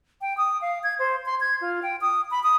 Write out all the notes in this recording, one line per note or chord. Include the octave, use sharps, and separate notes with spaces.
G5
D#6
F5
G#6
C5
C6
G#6
F4
G5
D#6
B5
D#6